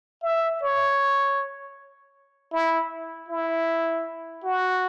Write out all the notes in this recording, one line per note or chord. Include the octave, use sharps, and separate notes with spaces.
E5
C#5
E4
E4
F#4